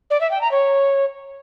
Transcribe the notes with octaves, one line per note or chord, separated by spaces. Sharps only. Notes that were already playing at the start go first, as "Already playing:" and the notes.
D5
E5
G5
A#5
C#5